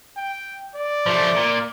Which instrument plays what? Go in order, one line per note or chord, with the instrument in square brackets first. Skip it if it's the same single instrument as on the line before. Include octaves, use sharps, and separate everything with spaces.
[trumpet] G5
D5
[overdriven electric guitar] F3 A3
A#2